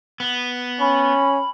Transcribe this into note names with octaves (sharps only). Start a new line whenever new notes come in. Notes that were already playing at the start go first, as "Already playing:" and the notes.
B3
C#4 B5